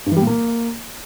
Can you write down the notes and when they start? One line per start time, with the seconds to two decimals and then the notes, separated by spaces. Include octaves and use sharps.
0.06 G2
0.11 E3
0.17 G3
0.22 A#2
0.27 A#3